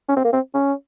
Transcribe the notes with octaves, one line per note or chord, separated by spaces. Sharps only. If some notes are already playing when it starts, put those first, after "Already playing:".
C#4
C4
A#3
C4
C#4